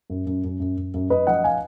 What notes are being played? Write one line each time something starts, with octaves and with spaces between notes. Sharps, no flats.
F#2
F#2
F#2
F#2
F#2
F#2
F#2 B4 D#5
F3 D#5 F#5
F5 G#5